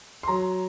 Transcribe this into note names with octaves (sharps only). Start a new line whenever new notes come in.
C6
F#3 A#5